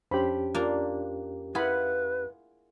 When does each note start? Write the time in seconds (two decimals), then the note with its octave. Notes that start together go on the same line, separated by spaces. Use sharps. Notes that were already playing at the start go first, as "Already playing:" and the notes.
0.11 F2 C#4 D4 G4 C5 B5
0.55 A#3 D4 F4
1.55 E4 F4 G#4 B4 F#5 B5